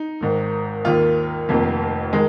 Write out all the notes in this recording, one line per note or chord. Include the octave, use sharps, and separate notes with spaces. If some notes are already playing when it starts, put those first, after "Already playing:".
Already playing: D#4
G#1 G#2 D#3
D#2 D#3 A#3 F4
F1 F2 D#3 A#3
D#3 G#3